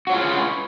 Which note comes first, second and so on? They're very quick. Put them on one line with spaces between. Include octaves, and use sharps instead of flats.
F#4 C#5 F4 G#4 B4